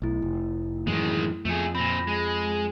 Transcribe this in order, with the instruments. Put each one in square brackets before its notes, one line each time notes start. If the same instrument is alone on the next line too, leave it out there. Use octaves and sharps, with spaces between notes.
[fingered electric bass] B1 [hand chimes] A3 E4
[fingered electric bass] F1
[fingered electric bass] F#2 A2 E3 [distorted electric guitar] D#3 G#3
[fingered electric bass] F2 F3 [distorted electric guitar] A3 G#4
[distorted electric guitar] A#2 C4 [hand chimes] B5 A#6
[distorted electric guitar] G#3